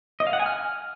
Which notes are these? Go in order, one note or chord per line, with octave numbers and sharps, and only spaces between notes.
D#5
F5
F#5
G#5
F6